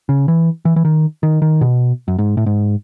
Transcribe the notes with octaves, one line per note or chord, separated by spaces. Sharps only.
C#3
E3
E3
E3
D#3
D#3
D#3
B2
F#2
G#2
A2
G#2